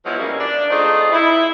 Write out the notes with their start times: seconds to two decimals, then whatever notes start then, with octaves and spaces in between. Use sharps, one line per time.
0.06 F3 F#3 G#3 B3 E4
0.19 C#3 G3 A#3 C#4
0.40 D4
0.70 A3 C4 D#4 F4 G#4
1.13 E4